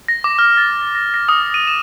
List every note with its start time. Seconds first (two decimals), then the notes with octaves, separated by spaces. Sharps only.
0.08 A#6
0.24 D6
0.39 F6
0.57 A6
0.95 A#6
1.14 A#6
1.29 D#6
1.54 D#7
1.67 E7